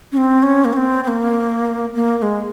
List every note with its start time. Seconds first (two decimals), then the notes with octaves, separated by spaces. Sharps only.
0.12 C#4
0.17 C4
0.43 C#4
0.65 A#3
0.73 C#4
0.77 C4
1.04 C4
1.08 A#3
1.95 A#3
2.18 A#3
2.22 G#3